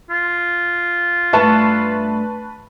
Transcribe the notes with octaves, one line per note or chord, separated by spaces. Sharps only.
F4
G2 A3 B4 E5 A5 C#6